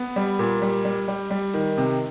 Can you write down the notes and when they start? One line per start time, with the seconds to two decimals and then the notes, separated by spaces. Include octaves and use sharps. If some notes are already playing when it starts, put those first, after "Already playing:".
Already playing: B3
0.16 G3
0.39 A#2
0.62 G3
0.85 G3
1.08 G3
1.31 G3
1.54 D#3
1.77 C3